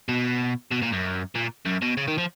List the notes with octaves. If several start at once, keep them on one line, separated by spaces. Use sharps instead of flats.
B2
B2
A#2
F#2
A#2
F#2
B2
C#3
D#3
F3